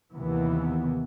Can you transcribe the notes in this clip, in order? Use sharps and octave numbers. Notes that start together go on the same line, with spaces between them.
D#2 C3 E3 B3